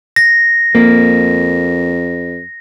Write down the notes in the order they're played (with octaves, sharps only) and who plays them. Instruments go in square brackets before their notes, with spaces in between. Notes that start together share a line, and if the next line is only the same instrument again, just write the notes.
[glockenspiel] A#6
[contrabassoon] F2 [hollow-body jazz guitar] A#3